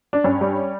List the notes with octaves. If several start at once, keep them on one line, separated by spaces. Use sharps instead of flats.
D4
G2 C#4
G3